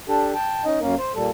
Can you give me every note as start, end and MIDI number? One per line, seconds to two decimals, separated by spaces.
0.08 0.33 62
0.08 0.33 67
0.08 0.33 69
0.35 0.64 79
0.35 0.64 81
0.65 0.80 61
0.65 0.80 63
0.65 0.80 75
0.80 0.95 42
0.80 0.95 58
0.80 0.95 61
0.80 0.95 70
0.99 1.12 72
1.15 1.31 46
1.15 1.31 55
1.15 1.31 69